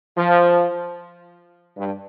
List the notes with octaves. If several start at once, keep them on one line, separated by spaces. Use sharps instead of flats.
F3
G2